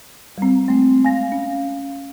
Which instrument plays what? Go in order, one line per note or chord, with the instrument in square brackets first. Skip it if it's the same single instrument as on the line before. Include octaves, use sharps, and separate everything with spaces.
[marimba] G3 C4
[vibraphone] G#3 C4 [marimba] A3
[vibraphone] F5 [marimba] G#5 A#6
[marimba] C#4